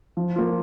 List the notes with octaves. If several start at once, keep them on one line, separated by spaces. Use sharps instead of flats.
F3
A#3 F4